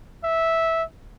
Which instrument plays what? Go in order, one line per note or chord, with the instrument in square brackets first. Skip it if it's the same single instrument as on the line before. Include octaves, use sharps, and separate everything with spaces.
[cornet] E5